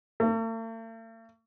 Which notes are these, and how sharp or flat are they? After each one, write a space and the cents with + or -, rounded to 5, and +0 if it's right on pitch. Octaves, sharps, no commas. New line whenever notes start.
A3 +45